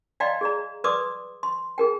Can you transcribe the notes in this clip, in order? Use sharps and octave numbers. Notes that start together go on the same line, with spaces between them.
D5 D#5 F5 G5 A#5 C6
G#4 D5 A#5
B4 D5 C6 D6 D#6
C6
G#4 A#4 G5